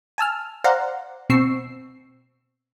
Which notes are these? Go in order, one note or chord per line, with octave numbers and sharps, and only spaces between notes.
G#5 A5 E6 F6
C5 D5 F5 F#5 A#5
B2 C4 C#6 E6 C7